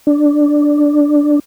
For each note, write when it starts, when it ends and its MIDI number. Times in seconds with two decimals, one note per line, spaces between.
0.07 1.39 62